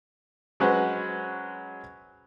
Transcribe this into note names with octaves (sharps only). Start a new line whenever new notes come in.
F#3 G#3 C#4 B4 C5 F#5